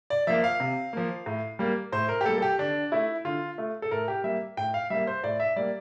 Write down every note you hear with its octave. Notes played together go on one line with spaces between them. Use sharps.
D5
F3 A#3 E5
F5
C3
F3 A#3
A2
G3 A#3
A2 C5
A#4
G4
G3 A#3 A4
A4
G4
D3 D4
A3 E4
D3 F4
A3
A4
A2 A#4
G4
G3 A#3 E5
A2 G5
F5
G3 A#3 E5
C5
A2 D5
E5
G3 A#3 D5